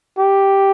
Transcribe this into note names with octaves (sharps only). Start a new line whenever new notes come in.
G4